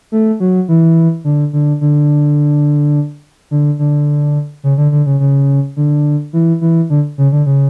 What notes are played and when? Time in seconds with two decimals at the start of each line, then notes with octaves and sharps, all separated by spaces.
0.12 A3
0.40 F#3
0.68 E3
1.24 D3
1.53 D3
1.81 D3
3.51 D3
3.79 D3
4.64 C#3
4.78 D3
4.92 D3
5.06 C#3
5.20 C#3
5.77 D3
6.33 E3
6.61 E3
6.90 D3
7.18 C#3
7.32 D3
7.46 C#3